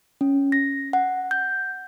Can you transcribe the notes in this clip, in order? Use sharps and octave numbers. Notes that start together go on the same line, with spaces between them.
C#4
A#6
F#5
G6